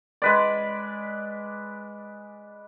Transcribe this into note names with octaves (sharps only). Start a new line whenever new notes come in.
G#3 B4 D5